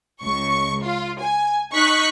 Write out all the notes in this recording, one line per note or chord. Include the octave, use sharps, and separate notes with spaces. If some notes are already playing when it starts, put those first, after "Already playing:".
C#2 C#6
F4
G#5
D#4 C#6 F#6 B6